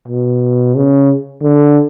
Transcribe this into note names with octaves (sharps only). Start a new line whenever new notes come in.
B2
C#3
D3